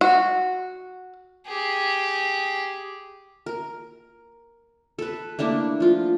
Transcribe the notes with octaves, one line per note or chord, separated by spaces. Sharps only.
F#4
G4 G#4
A#4
A4 B4
A3 A#3 D4 E4
F3 F4